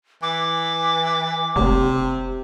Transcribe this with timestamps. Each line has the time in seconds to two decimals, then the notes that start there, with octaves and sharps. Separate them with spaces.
0.23 E3 D6
1.56 F1 C3